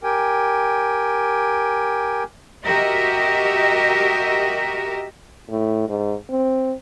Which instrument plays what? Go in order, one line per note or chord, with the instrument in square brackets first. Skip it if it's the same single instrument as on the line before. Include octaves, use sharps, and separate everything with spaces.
[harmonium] G4 A#4 G5 G#5
[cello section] F#4 G4 A#4 D#5 E5
[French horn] A2
G#2
C4